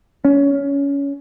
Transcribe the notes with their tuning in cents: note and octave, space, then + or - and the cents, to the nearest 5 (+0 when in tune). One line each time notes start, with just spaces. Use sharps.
C#4 +20